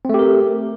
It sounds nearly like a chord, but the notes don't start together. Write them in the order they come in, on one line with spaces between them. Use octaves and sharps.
C4 A3 G4 A#4